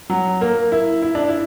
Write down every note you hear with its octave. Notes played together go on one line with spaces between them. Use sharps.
F#3
A#3
E4
E4
D4
E4